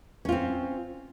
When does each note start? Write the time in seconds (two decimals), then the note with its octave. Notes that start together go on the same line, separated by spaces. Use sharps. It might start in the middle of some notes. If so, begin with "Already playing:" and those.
0.25 C#4
0.29 F4
0.32 C4